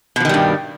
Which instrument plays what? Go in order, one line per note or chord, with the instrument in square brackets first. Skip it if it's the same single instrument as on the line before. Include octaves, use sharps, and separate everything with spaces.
[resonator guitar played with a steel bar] B2
F3
D#3
G3
G2